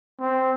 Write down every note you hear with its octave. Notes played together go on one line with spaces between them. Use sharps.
C4